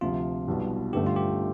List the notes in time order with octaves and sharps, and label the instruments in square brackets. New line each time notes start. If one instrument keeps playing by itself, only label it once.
[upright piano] D2 C3 F3 [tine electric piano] F4
[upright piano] B1 B2 G3
[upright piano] G1 G2 D3 A3 [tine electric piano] G4
[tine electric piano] F4
G4